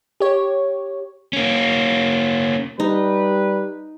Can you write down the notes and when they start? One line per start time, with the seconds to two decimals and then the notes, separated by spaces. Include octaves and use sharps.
0.20 G4 C#5
1.33 A#3 C#4
2.80 G3 D#4 B4